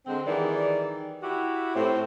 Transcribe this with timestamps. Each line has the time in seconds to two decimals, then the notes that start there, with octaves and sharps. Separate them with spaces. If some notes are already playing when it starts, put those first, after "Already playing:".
0.06 D3 G#3 C4
0.26 D#3 E3 G3 G#4 D5
1.23 E4 F#4 G4
1.75 A2 C4